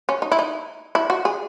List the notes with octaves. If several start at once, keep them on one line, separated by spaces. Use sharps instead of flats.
C#4
D#4
E4
D#4
E4
F#4
G#4